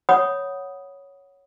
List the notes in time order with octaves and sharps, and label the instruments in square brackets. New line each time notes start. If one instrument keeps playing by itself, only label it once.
[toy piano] C#5 F#5 B5 D#6